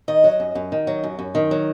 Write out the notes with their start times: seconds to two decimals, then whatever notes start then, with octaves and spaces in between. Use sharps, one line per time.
0.08 D#3 D#5
0.24 F#3
0.40 F#2
0.55 F#2
0.72 D#3
0.87 F#3
1.04 F#2
1.19 F#2
1.35 D#3
1.51 F#3